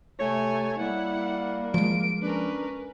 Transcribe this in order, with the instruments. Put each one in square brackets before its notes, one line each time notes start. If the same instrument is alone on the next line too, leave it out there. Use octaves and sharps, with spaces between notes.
[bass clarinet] C3 [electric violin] A3 G#5 [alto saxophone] C#5
[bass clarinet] G3 [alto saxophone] A#3 [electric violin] E4 F#5
[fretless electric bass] F3 G#3 [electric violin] D7
[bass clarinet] C#4 [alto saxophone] D4 [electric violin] A#4 B4